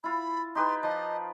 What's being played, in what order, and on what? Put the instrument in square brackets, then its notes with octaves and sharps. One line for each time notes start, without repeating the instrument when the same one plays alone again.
[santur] E4 F4 [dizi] B5
[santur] D#4 G4 B4 [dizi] C6
[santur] F3 [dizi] D#5